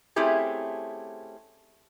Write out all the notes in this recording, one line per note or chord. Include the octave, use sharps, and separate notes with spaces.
A3 C4 C#4 E4 G4 G#4